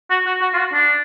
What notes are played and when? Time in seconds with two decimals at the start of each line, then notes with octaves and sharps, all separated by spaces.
0.10 F#4
0.27 F#4
0.41 F#4
0.54 F4
0.58 F#4
0.73 D4